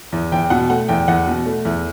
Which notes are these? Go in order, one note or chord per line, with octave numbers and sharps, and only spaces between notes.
E2
E2 G5
B2 F#5
A3 F#5
E2 G5
E2 F#5
B2
A3
E2